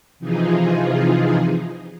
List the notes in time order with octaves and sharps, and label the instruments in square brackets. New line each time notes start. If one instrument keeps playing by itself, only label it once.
[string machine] C3 E3 F3 D#4 F4 G#4